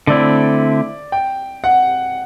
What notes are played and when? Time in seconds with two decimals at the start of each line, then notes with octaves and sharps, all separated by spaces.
0.07 D3 A3 C4 E4 D5
1.12 G5
1.64 F#5